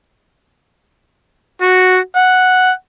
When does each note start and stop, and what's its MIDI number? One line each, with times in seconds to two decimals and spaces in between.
1.62 1.97 66
2.16 2.70 78